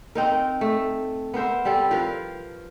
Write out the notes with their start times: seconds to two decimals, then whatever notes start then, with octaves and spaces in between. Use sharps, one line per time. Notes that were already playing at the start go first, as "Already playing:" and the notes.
0.15 C4 D#4 A#4
0.61 A3
1.34 B3 A#4 C5 E5
1.65 G3 C4 A4
1.91 F3 A#4 B4 F5